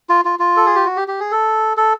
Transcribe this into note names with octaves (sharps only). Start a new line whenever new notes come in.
F4
F4
F4
A4
G#4
G4
F#4
G4
G4
G#4
A4
A4